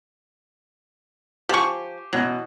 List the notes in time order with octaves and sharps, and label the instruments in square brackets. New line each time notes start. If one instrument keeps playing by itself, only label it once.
[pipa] F3 C#6 [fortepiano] G4 C5 G#5
[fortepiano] B2 E3 [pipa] F#3